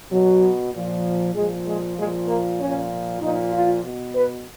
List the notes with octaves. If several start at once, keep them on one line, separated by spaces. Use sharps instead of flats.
B2 F#3
A#2 F3
A#2 F3 G#3
G#3
A#2 F3 G#3
A#3
A#2 F3 C#4
A#2 F3 D#4
F4
B2
B4